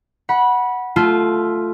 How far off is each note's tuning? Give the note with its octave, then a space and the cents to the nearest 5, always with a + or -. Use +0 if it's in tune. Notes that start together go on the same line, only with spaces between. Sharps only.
F#5 +0 B5 -20
A3 +0 F4 +0 A5 -30